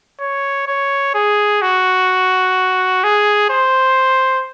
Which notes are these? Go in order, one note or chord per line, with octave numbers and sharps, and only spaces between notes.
C#5
C#5
G#4
F#4
G#4
C5